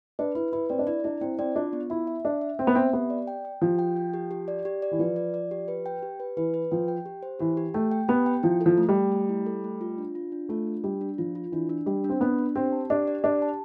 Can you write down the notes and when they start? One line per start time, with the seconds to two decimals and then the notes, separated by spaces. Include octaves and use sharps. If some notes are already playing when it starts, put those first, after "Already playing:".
0.19 D4 B4
0.35 E4 B4
0.53 E4 B4
0.70 C4 D5
0.79 D4
0.87 E4 D5
1.04 D4 E4
1.21 C4 E4
1.39 C4 D5
1.56 D4 F4
1.73 B3
1.90 E4 E5
2.07 E5
2.25 D4 E5
2.41 E5
2.59 C4 E5
2.67 B3
2.75 C4 E5
2.93 B3 G4
3.10 D5
3.27 G5
3.45 G5
3.62 F3 G4
3.79 G5
3.97 G5
4.14 G4
4.31 G4
4.48 D5
4.65 G4
4.82 D5
4.91 E3
4.99 F3 B4
5.16 D5
5.34 D5
5.51 G4
5.68 B4
5.86 G5
6.03 G4
6.20 B4
6.37 E3 B4
6.54 B4
6.71 F3 G5
6.88 G5
7.06 G4
7.23 C5
7.39 E3 G4
7.57 G4
7.74 A3 G5
7.91 G5
8.08 B3 G4
8.26 G5
8.43 F3 E4
8.61 A4
8.66 F3
8.78 A3
8.89 G3
8.95 A3
9.12 A3
9.29 E4
9.46 A4
9.64 A3
9.81 F4
9.98 D4
10.15 F4
10.32 D4
10.49 A3 F4
10.67 D4
10.84 G3 D4
11.01 D4
11.18 F3 F4
11.35 F4
11.52 E3 D4
11.69 D4
11.86 G3 D4
12.04 D4
12.09 C4
12.21 B3 D4
12.38 D4
12.55 C4 G4
12.72 A5
12.90 D4 G4
13.07 D5
13.24 D4 G4
13.42 A5